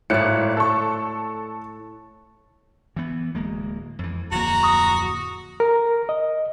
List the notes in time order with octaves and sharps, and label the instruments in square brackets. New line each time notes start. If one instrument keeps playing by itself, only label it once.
[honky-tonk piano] G#1 F#6 C#7 [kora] A2 D5
[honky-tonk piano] A4 C#6
[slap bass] E3 B3
D1 G#3 A#3
F2 E3
[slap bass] D1 F2 A#3 [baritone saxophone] F#4 [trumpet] A#5
[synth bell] C#6 D#6
[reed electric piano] A#4
D#5